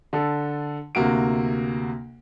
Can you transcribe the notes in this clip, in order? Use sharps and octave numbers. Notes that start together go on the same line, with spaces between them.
D3 A4
D2 C3 A#3 F#4 D7